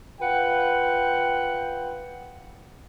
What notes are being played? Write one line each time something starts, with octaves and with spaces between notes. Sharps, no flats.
F4 B4 F#5 G5